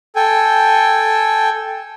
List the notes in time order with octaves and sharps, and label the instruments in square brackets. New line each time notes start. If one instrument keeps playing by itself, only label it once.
[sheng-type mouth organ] A4 G5 G#5